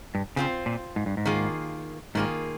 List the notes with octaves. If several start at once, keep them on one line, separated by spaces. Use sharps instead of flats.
G2
C#3 C4 F4 C5
A#2
G#2
G2
G#2
D#3 A#3 F4 G#4
G#2 D#3 A#3 F4 G#4